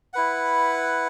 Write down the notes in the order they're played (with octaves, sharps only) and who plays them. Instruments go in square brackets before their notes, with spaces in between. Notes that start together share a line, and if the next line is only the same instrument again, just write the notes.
[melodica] E4 B4 F#5